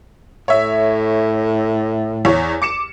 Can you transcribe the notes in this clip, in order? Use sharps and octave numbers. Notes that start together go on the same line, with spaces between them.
A2 C#5 E5
E2 C#5
D6 C#7 E7